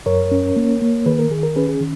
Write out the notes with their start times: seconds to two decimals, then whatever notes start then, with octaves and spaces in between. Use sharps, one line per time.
0.06 F#2 A#4 C#5
0.32 C#4
0.56 A#3
0.82 A#3
1.06 D#3 G#4 B4
1.19 A#4
1.30 D#3 G#4
1.43 A#4
1.56 C#4 G#4 B4
1.69 G#4
1.80 D#3